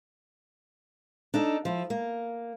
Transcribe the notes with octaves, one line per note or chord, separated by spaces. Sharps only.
D4 D#4 A4
F3 E4
A#3